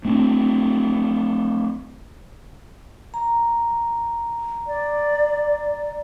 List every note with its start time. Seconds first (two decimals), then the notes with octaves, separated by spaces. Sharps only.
0.05 A3 C4 D4
3.14 A#5
4.67 D5